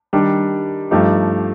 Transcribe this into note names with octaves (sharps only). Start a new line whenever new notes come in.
D#3 G3 D4
G2 F3 A3 D#4 G4